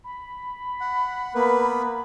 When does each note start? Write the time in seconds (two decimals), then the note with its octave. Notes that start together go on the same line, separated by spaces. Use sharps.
0.04 B5
0.80 F#5
1.35 A#3 B3 B4